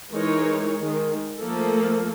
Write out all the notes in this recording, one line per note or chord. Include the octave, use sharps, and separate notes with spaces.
E3 G#3 D#4 A#4 C#5
D#3 G#3
F3 A3 A#3 A4